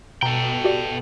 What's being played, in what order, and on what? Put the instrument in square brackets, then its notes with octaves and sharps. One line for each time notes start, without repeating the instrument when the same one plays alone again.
[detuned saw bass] B2 [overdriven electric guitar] A4 G5 [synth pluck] A#5
[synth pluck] F#4 G4 D5